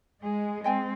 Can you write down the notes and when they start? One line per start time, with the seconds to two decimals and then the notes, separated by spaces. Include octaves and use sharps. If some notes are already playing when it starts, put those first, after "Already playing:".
0.23 G#3 G#4
0.64 C4 D#5 G5 G#5